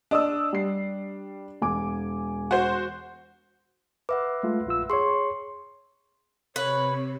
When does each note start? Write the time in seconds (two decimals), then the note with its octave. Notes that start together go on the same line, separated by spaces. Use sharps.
0.11 D4 D#5 D#6 E6
0.53 G3 C7
1.62 E1 G#5 D6
2.51 F#4 C5
4.09 B4 E5 F#5 D6
4.43 G#3 A3 F4
4.66 A#1 F4 E6
4.90 G#4 C#5 C6 C#6
6.56 C3 B4 C#5